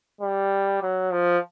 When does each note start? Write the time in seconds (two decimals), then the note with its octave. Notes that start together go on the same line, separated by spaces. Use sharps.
0.21 G3
0.82 F#3
1.12 F3